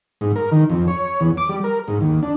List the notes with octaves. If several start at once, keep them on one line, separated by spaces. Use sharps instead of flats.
G#2
A#4
D#3
F2
C#5
E2
D6
G3
A#4
G#2
D#2
D4